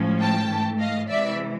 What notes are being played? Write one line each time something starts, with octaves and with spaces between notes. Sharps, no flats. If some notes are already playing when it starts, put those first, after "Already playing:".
Already playing: A2 F3 G#3 C#4
G5 A5
G#2 E3 A3
D#5 F5
C3 E3 G#3 D5 E5